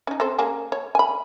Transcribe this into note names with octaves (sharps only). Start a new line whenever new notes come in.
C#4 D#4
C4 A4 C5
A#3 C#4 G#4
C#5
G#5 B5